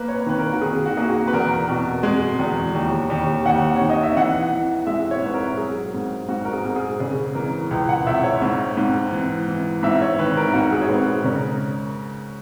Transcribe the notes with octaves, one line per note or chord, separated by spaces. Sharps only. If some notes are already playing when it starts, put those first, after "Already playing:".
Already playing: A#3 B4
C#5
B4
D#3 B4
A#4
F#4
D#3 G#4
F#4
A#3 G#4
F#4
B4
E2 A#4
B2
G#3
E2
D#2
D#2
D#2 F#5
C#5
D#3
D#5
E5
E3 F#5
E3
G#3 E5
C#5
G#2 B4
A#4
F#3 G#4
G#2
G#2 F#4
A#4
G#4
G#2
G#4
C#3 G#4
E3 A#4
C#2 B4
F#5
C#2 E5
C#5
G#2
G#2
E3
E3
G#2 E5
C#5
D#3 B4
A#4
G#2 F#4
G#4
C#5
G#2 B4
C#3 A#4